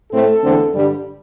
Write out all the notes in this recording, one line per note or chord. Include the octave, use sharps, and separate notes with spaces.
A2 A3 C4 A4
E2 D3 A3 C4
G2 D3 G3